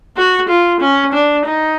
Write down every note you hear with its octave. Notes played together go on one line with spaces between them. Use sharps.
F#4
F4
C#4
D4
D#4